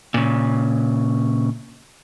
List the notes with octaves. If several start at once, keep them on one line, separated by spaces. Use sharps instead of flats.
A#2 C#3